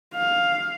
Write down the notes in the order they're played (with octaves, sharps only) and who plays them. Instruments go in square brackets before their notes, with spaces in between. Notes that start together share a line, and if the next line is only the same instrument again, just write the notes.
[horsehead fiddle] F5